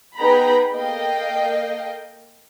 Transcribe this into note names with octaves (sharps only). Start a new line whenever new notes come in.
B3 D#4 G#4 G5 A#5 B5
A#3 A4 D#5 F5 G5